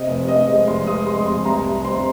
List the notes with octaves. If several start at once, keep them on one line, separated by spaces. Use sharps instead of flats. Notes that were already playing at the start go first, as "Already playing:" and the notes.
Already playing: C3 D#5
F1
C3 D#5
G#3 D#5
F1 C6
G#3 D#6
G#3 C6
F1 C6
C2 A#5
C2
C4 C6